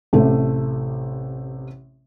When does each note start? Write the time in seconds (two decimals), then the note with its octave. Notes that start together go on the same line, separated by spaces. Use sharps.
0.13 A1 C3 A3 A4